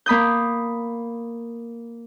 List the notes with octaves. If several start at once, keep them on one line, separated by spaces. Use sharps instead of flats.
A#3 B5 D#6 G6